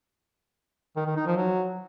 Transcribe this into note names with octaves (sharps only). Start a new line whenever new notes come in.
D#3
D#3
D#4
F3
F#3